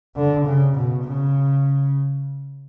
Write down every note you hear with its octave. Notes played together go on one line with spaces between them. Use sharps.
D3
C#3
B2
C#3